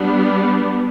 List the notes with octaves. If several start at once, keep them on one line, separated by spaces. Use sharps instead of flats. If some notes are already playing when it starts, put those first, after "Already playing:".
Already playing: G3 B3 D4